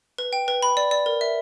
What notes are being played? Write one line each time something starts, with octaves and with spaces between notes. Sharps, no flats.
B4
G5
B4
B5
D5
D5
A#4
E5